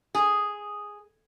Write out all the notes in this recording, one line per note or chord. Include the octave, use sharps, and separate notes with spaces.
G#4